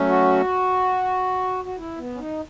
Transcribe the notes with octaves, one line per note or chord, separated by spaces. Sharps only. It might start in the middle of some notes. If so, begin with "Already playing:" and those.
Already playing: F#3 A3 C#4
F#4
F#4
E4
B3
C#4
D#4